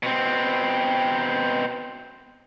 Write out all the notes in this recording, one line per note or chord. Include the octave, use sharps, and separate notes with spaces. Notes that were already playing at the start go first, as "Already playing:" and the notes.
B2 C4